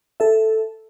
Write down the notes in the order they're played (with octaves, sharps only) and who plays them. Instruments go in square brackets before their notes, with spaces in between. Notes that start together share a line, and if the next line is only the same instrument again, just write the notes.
[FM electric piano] A4 E5